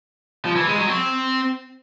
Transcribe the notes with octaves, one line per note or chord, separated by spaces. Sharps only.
F3
E3
G#3
F#3
C4